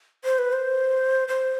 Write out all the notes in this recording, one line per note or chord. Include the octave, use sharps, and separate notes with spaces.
C5
B4
C5
C5